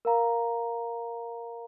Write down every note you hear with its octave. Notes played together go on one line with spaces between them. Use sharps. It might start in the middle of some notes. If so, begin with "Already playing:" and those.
A#4 F5 A#5